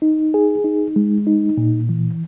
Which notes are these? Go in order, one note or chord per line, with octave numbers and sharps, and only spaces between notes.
D#4
G#4
D#4
G#3
D#4
A#2
E3